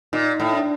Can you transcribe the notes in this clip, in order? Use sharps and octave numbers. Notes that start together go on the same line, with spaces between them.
A#2 D#4
A2
D4